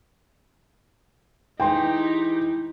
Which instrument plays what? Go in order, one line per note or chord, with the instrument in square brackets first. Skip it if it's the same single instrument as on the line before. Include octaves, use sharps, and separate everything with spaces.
[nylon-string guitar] E3 G#3 [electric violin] D#4 G4 [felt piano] G5 C6